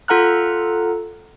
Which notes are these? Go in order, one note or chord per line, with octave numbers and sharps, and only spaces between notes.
F4 A4 F#5 A#5 F6 F#6